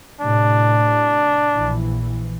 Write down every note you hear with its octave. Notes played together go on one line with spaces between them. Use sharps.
A2 C3 D4
A#1 E3